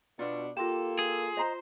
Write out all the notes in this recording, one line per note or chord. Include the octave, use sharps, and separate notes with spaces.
B2 D4 F4
A#3 F4 G4 A4 C6 E7
G#4
C5 D#5 A#5